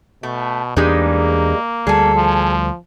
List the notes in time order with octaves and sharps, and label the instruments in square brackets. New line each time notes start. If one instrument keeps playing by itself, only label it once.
[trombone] B2 [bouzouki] A3
[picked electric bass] E2 E3 D4 [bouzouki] G3 G#3 D#4 [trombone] A#3
[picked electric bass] D2 G3 [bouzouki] G#4 A4
[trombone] F3